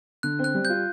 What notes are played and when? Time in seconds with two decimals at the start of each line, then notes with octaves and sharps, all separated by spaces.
0.23 D3 F#6
0.39 C4
0.44 F#6
0.54 G3
0.65 F4 G6